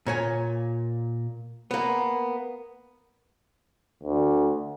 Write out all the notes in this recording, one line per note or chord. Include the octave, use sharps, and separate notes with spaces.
A#2 C#5 G#5
A#3 B3
D2